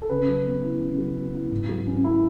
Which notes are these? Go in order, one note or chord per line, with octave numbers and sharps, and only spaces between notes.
A4
C#3 B4
F#3
B3
E4
C#3
F#3
B3
E4
G#2
F#3
C#4
E4